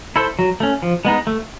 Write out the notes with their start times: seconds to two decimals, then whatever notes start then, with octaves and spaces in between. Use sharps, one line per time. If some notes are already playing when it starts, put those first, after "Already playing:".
0.16 E4 A4 C5
0.39 F#3
0.60 A3 C#4
0.83 F3
1.05 G#3 B3 D#4
1.27 A3